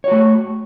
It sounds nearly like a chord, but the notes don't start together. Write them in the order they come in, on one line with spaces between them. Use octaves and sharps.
C#5 F#4 A3